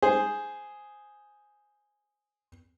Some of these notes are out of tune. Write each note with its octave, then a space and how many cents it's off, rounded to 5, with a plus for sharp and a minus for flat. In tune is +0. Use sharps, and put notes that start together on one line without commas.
G#4 +0 C5 +0